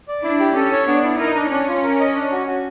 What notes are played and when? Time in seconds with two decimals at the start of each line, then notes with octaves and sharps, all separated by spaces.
0.08 D5
0.24 D4 E4
0.40 G4
0.55 C#4 A4
0.72 C#5
0.87 B3 D4
1.04 E4
1.19 D#4 A#4
1.35 D4
1.51 C#4 D4
1.68 F4
1.83 A#4
2.00 D#5
2.15 D4
2.32 F#4
2.47 F#4